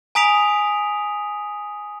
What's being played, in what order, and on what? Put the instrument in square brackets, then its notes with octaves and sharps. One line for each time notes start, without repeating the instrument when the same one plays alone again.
[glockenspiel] G#5 A#5 D#6 B6 D7 F7